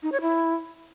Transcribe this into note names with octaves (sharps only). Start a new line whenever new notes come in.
D#4
C#5
E4